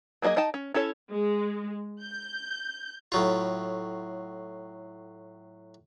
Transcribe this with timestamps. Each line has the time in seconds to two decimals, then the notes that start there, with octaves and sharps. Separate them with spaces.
0.22 F#3 A#3 D4 G#4 D#5
0.36 D#4 D#5 G5 A5
0.54 C#4
0.74 C#4 E4 A4 C#5
1.10 G#3
2.02 G6
3.12 A2 F#3 F4